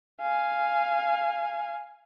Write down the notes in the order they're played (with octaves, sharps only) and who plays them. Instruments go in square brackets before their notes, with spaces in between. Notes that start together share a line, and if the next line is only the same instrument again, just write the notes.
[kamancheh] F5 G#5